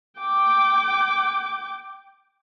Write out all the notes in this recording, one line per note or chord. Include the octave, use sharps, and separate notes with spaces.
G5 D6